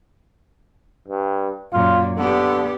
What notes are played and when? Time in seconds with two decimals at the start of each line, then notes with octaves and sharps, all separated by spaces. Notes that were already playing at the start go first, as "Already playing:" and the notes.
1.08 G2
1.73 F#2 A#2 F4
2.17 D3 B3 G4